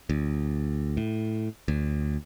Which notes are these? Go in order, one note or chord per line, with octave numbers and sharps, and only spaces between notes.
D2
A2
D2